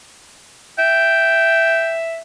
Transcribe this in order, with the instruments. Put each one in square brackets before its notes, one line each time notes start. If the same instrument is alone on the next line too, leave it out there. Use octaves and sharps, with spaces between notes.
[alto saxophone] E5 [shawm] G5